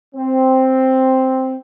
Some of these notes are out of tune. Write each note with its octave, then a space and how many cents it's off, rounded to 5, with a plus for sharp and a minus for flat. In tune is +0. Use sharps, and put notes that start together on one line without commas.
C4 +0